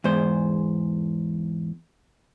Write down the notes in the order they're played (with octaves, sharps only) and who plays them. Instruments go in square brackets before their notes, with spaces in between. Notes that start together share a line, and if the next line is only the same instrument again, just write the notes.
[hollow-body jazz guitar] E2 G#2 C5